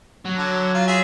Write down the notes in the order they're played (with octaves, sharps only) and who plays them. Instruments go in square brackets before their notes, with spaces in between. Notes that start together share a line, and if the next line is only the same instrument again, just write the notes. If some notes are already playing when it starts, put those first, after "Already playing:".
[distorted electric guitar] F#3
[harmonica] D3
F4
F4 G#4 E5